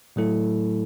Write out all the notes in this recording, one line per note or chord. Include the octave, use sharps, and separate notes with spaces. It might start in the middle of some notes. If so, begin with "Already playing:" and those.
A2 F#3 A3 E4 A4